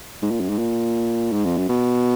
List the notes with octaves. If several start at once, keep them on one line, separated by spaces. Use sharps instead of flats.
G#2
A#2
F#2
G#2
A#2
G#2
F2
F#2
B2